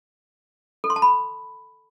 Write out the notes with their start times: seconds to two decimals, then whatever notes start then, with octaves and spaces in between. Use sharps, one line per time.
0.84 A4
0.90 C6
0.96 A5
1.02 B5